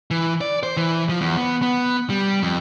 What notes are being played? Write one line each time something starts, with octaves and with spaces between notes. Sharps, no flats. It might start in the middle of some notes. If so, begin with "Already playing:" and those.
E3
D5
C5
E3
F3
E2
B3
B3
G3
F2